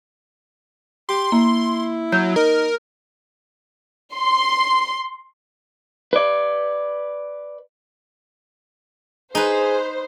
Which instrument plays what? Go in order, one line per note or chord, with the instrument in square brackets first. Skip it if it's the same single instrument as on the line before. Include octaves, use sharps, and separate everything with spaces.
[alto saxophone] G4 [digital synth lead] C6
[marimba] A#3 [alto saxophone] E4
[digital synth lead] F#3 [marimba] G6
[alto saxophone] D#4 [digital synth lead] A#4
[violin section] C6
[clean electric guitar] B4 D5
[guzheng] D#4 B4 [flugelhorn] G#4 [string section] C5